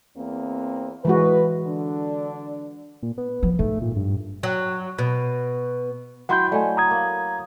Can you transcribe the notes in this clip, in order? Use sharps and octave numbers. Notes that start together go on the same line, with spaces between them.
E2 A#3 C4
E3 G#3 F#4 B4
D3 D4
A#2
B3
F3
G#2 A3
A#2
G2
F#3
B2
F#3 E4 F#5 G5 C6 G6
A3 D5 D#5 G#5
A#5 D#6 G#6
A#3